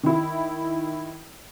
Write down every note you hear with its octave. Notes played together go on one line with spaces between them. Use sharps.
D#3 E4